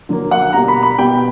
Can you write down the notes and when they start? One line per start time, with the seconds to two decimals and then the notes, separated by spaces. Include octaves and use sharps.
0.09 D3 F#3 A#3
0.31 F#5
0.53 B2 G3 A#3 A#5
0.68 B5
0.83 B5
0.98 B2 G3 B3 G5